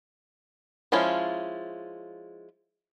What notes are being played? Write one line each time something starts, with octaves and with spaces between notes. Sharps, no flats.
F3 G#3 C#4 E4 F4